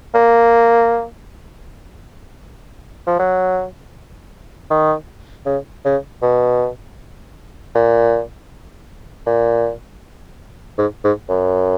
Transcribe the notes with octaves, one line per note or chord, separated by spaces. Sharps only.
A#3
F3
F#3
D#3
C#3
C#3
B2
A#2
A#2
G#2
G#2
F#2